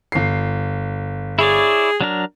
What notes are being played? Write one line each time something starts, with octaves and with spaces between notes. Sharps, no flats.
G1 C7
E4 G#4 C#5 D5
F#3 D4 A#4